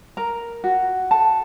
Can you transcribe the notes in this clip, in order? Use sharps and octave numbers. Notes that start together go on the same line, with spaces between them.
A#4 A#5
F#4
A4 A5